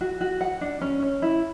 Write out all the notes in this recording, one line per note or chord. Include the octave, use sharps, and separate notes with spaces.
F#4
F#4
F#5
D4
C#4
C#4
E4